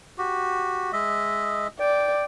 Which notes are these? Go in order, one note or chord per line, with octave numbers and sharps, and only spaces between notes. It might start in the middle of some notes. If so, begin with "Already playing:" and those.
F#4 G4
G#3 D#5 E5
D5 G5